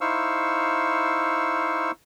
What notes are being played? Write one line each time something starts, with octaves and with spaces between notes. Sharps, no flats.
D#4 E4 C5 F5 C#6 E6